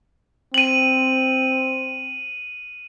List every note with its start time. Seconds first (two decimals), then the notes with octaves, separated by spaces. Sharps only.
0.54 C4 D#7 F#7